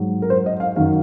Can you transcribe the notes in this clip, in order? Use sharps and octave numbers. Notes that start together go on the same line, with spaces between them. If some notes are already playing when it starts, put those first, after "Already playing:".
Already playing: G#2 F#3
A#4
C5
D#5
F5
F#2 D#3 F#3 F5